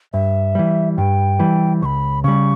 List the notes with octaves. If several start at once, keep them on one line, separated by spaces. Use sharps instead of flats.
G2 E5
E3 G3
G2 G5
E3 G3
C#2 B5 C#6
C#3 G3 C#6